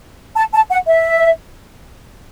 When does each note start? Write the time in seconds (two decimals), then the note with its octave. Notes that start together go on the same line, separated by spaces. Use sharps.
0.36 A5
0.54 A5
0.71 F#5
0.88 E5